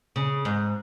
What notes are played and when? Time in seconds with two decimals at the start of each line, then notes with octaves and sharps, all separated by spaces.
0.16 C#3
0.45 G#2